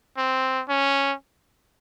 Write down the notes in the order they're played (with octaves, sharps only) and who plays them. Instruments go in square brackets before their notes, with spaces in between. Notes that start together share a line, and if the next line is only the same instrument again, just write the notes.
[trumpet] C4
C#4